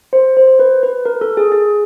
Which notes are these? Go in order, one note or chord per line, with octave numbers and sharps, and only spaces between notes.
C5
C5
C5
B4
B4
A#4
A4
G#4
G#4